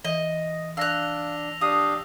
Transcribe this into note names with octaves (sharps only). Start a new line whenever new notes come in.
E3 D#5
D4 F5 E6 F#6 A#6 F7
D4 G4 F5 D#6